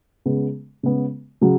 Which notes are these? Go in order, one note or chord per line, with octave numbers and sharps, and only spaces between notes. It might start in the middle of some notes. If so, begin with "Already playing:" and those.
C#3 G#3 B3
C#3 G#3 B3
C#3 F#3